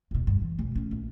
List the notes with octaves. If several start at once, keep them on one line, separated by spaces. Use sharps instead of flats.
E1 B2
G2
E3
F#1 B1
F1 C#4
A#1